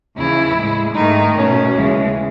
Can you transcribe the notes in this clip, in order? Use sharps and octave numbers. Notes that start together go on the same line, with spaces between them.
D#2 C#3 E3 E4
A2 G#3
G#2 D#3 A3 D#4
B2 A3 C#4
D#2 C#3 E3 G#3